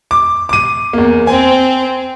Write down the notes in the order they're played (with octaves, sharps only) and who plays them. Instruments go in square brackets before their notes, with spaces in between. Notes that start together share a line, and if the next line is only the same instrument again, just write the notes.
[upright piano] D6
D6 D#7
E2 A#3
[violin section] C4 [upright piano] G#5